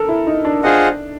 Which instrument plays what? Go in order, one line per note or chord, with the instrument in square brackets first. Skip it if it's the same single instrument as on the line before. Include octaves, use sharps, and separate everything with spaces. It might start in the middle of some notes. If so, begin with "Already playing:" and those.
Already playing: [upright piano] A4 A#4
E4
D#4
D4
[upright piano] D4 [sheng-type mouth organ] F4 G#4 C5 D#5 F#5